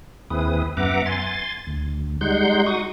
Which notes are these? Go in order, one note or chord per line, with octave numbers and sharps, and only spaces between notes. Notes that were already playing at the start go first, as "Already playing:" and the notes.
D#2 C4 E4 G#4 B4 D#6
F#2 B3 E5 F#5 A#5 D6
G#5 C6 A6
D2
G3 G#3 D#4 F#5 C6 G6
F#4 C#6 D#6